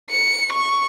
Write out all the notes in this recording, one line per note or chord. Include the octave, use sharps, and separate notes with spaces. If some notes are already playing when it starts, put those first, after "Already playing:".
C#7
C#6